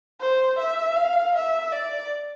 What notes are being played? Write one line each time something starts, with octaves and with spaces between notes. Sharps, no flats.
C5
E5
F5
E5
D5